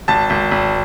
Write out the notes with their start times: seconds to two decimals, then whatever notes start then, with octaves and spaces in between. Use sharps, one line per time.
0.08 G#1 A5 A6
0.30 G#1
0.51 G#1